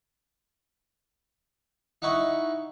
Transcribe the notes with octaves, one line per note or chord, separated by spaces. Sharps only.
D#4 E4 F#5 C#6